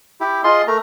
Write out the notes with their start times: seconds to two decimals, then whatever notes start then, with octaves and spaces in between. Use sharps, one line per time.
0.20 E4 G4
0.44 F4 G#4 D#5 C6
0.68 A3 A#4 A#5